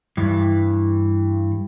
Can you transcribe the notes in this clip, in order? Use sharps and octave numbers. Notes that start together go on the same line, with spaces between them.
G2 E3